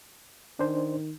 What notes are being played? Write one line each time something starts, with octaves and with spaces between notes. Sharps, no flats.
D#3 D4 C5